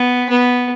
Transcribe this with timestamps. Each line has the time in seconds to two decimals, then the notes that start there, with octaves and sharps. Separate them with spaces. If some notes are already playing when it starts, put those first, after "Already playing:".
Already playing: B3
0.30 B3